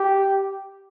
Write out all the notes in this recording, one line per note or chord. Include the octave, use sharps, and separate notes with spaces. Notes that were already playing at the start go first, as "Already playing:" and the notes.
Already playing: G4